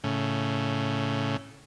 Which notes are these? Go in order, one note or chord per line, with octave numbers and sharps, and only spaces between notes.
A2 C#3